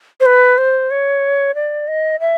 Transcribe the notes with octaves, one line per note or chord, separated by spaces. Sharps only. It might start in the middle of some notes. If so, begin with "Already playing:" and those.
C5
B4
C5
C#5
D5
D#5
E5